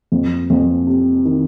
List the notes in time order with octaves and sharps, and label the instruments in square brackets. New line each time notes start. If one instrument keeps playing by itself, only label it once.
[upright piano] F2
F2
C3
D#3